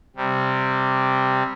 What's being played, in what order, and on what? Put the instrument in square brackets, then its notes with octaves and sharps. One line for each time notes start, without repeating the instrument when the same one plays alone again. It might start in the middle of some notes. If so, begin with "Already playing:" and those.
[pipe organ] C3 G3